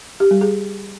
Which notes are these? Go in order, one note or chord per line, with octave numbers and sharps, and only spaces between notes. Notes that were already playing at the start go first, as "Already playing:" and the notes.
G4
G3
G#4